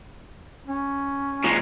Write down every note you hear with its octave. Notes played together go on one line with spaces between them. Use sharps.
C#4
A#2 G#3